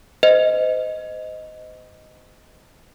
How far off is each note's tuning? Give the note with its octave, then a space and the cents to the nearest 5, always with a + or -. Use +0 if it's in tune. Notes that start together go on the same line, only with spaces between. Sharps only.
C5 -35 D#5 +0